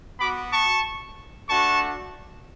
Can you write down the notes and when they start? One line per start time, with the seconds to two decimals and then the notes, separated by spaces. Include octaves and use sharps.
0.19 B3 F#4 B5 D6
0.52 A5 C#6
1.49 A3 D4 F#4 A5 C#6